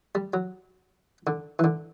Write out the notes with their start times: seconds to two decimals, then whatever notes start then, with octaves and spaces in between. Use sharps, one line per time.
0.15 G3
0.33 F#3
1.27 D3
1.59 E3
1.64 D3